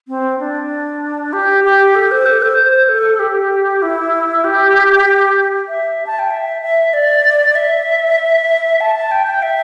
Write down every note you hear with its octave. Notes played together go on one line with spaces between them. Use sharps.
C4
D4
G4
G4
A4
C5
A4
C5
C5
A4
G4
E4
G4
E5
A5
G5
E5
E5
D5
E5
A5
A5
G5
G5
E5